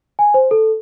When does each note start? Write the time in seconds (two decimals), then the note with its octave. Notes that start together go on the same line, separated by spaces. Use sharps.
0.19 G#5
0.34 C5
0.51 A4